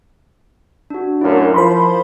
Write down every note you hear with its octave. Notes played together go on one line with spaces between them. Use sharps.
D4 F#4
F#2 A#2 A3 E4 A#4
F3 C5 B5 C6